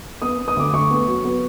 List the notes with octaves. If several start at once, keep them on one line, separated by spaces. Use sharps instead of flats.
B3 D#6
B3
D#6
D2 D6
D2 C#6
B3
F#3
B3